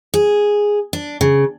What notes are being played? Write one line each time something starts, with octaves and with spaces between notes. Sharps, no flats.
G#4
D4
C#3